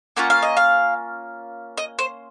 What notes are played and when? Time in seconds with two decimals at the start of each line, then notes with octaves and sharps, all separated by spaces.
0.16 A#3 C#4 F4 F#5
0.30 F5
0.42 D#5
0.57 F5
1.78 D#5
1.99 C5